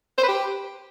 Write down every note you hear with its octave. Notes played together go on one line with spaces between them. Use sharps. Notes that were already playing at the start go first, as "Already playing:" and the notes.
C5
B4
G4